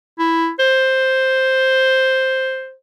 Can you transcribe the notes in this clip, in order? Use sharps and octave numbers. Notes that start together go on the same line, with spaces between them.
E4
C5